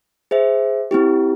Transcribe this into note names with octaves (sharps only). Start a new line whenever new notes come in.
G#4 C5 E5
C4 E4 G4